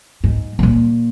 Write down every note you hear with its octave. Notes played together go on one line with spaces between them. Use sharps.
G#2
G#2
A#2